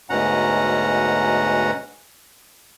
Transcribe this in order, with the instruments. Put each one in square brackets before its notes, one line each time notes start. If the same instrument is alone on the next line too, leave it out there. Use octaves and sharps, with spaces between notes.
[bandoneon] D2 G#2 B2 C#4 F#5 A#5